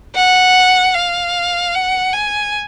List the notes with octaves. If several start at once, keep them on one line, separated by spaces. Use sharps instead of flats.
F#5
F5
F#5
G#5